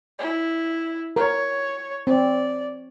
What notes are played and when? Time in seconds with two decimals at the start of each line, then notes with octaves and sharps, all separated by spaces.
0.19 E4
1.16 A#4 C#5
2.07 C4 D5